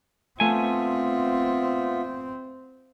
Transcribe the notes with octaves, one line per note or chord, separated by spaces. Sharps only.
A3 B3 C4 F4 E5 G#5